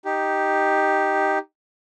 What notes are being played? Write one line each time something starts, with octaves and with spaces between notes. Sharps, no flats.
D#4 G4